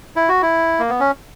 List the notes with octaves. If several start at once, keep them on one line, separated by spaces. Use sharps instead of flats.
E4
F#4
E4
A#3
B3
C#4